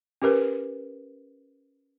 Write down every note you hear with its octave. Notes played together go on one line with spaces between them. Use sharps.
C#4 G4 A#4 B4